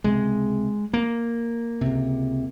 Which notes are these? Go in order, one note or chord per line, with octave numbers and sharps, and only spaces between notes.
C#2 C3 G#3
A#3
C#2 C3